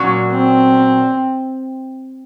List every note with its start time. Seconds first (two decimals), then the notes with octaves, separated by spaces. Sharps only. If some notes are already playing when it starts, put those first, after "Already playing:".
Already playing: A#2 F#3 C#4
0.31 C4